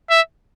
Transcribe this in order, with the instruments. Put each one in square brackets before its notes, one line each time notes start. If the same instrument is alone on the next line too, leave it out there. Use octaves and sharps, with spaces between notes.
[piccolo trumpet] E5